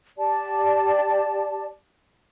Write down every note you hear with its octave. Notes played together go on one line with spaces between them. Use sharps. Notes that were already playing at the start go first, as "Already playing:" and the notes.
G4 D5 A5